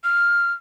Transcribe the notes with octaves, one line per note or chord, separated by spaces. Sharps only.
F6